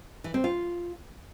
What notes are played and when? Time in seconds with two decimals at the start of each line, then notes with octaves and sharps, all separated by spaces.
0.24 E3
0.34 C4
0.44 F4